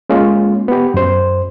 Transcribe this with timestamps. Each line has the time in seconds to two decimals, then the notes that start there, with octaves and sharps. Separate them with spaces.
0.10 G#3 A#3 C#4 F4
0.68 B3 G4
0.94 F#2 C5